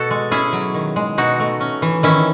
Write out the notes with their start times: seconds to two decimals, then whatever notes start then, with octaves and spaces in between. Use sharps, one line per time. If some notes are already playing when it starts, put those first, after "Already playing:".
Already playing: B2 F#4 A4
0.10 G#3
0.31 C#4 E4 G#4
0.53 F#3
0.74 D#3
0.96 G#3
1.18 B2 D#4 F#4
1.39 A3
1.60 C#4
1.82 E3
2.03 D#3 C#4 E4